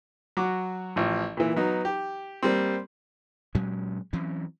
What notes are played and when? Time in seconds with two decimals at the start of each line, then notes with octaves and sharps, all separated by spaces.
0.37 F#3 F#4 D6
0.96 A1 F3
1.37 A#2 E3
1.56 F#3 B3 D#4
1.85 G4
2.43 G3 A#3 C4
3.55 A#2 F#3 G#3 C#4
4.13 E3 F#3 C4 C#4